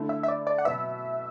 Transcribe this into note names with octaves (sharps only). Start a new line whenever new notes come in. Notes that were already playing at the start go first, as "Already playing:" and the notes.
Already playing: D3 A3 E4
E5
E5
D5
D5
F#5
B2 F#3 B3 E5